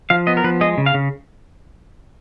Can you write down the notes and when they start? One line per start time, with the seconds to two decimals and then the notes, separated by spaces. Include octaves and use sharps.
0.10 F3 F5
0.27 B3 D#5
0.37 A#4
0.44 F3 B4
0.61 G#3 D#5
0.78 C#3
0.86 F5
0.94 C#3